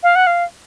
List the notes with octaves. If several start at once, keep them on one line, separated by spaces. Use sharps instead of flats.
F5
F#5
F5